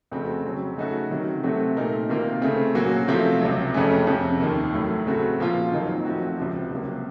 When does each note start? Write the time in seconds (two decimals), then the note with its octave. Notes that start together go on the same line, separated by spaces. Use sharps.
0.11 F2 C#3 A3 C4 F#4
0.44 C#3 F#3 C4
0.77 C#3 A3 D#4 F#4 A4
1.10 C3 D#3 F#3
1.43 C3 F#3 A3 C4 F#4
1.76 A#2 A3 D#4 A#4
2.09 C3 D#3 A#3 F4 A#4
2.42 C#3 A3 C4
2.75 A#2 F#3 A#3 C#4 F#4
3.08 C3 F3 A3 C4 F4
3.41 C#2 C3 F#3
3.74 F2 C#3 A3 C#4
4.07 F2 C3 F3
4.40 D#2 D#3 A#3
4.73 A2 F#3 A3
5.06 C#3 A3 C4 F#4 A4
5.39 A#2 F3 A#3 F4 A#4
5.72 F2 D#3 F#3 A#3 D#4
6.05 A2 F3 C4 F#4
6.38 C#2 C3 F3
6.71 C#2 C3 F#3 A#3